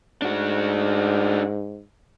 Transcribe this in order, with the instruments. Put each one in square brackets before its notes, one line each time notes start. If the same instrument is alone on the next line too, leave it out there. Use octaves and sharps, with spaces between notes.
[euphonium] G#2 [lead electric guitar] D4 F#4